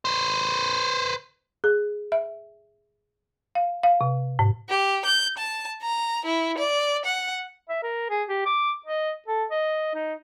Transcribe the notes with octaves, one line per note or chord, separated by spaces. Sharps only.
B4 C5
G#4
E5
F5
F5
C3
G#2
G4
G6
A5
A#5
E4
D5
F#5
E5
A#4
G#4
G4
D6
D#5
A4
D#5
D#4